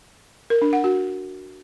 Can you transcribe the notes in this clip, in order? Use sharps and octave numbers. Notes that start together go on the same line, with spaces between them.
A#4
D4
F#5
F#4